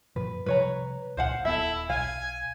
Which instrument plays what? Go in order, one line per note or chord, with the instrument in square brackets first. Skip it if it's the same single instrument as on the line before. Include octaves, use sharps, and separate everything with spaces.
[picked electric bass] F#2 A#2 F3 [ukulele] B4
[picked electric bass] C3 F3 G3 [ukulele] B4 C#5 A#5
[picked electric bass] C#2 A#2 [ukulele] C5 F5 F#5
[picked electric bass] D#1 B3 [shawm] E4 [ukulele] A4 E5
[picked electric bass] B1 [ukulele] F5 [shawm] G#5